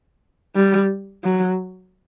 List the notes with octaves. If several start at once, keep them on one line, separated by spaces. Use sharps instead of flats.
G3
F#3